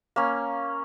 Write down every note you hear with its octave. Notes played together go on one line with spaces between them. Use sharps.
A#3 C#4